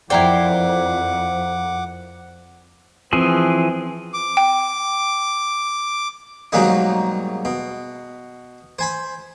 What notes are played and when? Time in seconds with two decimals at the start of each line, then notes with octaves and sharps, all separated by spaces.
0.10 F2 E4 A#4 C5 D5 F#5 G5 D6
3.13 E3 F3 C4 G#4
4.14 D6
4.37 G5
6.52 G#2 B2 F#3 G3 A#3 D#4
7.45 B2
8.79 C5 G#5 B5